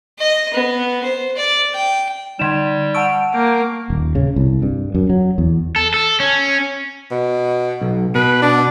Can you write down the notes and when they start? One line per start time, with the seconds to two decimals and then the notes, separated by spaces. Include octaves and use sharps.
0.19 D#5
0.54 B3
1.04 C5
1.36 D5
1.74 G5
2.39 D3 G3 D#4 D5 G#6 E7
2.94 F#5 A5 C#6 E6 D7
3.34 A#3 G5
3.90 D#1
4.15 C#3
4.36 C2
4.62 G2
4.95 F#2
5.10 F#3
5.38 E2
5.76 A4
5.94 A4
6.20 C#4
7.11 B2
7.81 B1
8.15 B2 B4
8.42 D4